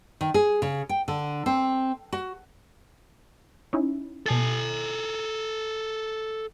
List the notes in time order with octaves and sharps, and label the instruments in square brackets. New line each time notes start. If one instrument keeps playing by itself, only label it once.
[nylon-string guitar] D#3
G#4
C#3
G5
D3
C4
F#4
[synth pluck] C#4 D#4 E4
[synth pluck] B2 A5 [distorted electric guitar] A4 G#5